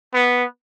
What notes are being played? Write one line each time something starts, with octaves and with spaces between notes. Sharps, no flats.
B3